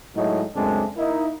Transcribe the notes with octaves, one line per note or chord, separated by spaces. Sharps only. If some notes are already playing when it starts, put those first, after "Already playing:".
A2 F#3 G#3 D#4
C#2 F#2 G#3 A3 C4 D4
A#3 D#4 E4